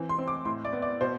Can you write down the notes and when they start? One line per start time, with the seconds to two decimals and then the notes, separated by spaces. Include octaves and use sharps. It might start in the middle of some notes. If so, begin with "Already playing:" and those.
Already playing: E3 C4
0.09 C6
0.18 C4
0.28 D6
0.45 A2 C6
0.65 D5
0.73 B3
0.82 D5
1.01 B2 C5